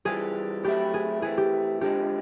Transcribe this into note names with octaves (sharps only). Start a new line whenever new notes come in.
E3 G3 C4 F4 G#4
A2 F#3 A3 C4 E4 G4
G#4
E3 A3 C4 G#4
G4
D3 F3 G#3 C4 G4